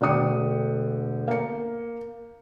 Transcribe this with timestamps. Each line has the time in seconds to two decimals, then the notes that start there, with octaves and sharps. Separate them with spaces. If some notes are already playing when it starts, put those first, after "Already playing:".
0.01 E1 D3 A3 G5 D#6 C#7
1.28 A#3 C#7